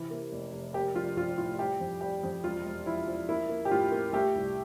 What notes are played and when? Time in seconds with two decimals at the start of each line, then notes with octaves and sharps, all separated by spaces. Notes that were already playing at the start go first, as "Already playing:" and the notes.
Already playing: C3 E3
0.11 A#3
0.32 F1
0.52 F1
0.74 A#3 G4
0.95 A#1 F4
1.17 A#1 F4
1.38 A2 F4
1.59 G3 G4
1.80 F2
2.01 G3 G4
2.23 F2
2.43 E1 F4
2.65 E1
2.86 F3 E4
3.07 F3
3.29 A#3 E4
3.49 A#3
3.65 G4
3.71 A2 F4
3.92 A#3
4.13 A3 G4
4.35 C2